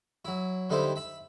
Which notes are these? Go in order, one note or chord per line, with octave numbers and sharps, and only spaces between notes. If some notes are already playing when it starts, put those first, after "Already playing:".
F#3 E4
D3 G3 D#4 E4 A4 C5
E5 B5